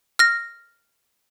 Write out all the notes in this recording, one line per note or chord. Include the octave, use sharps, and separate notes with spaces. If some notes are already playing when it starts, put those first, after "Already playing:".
F6 A#6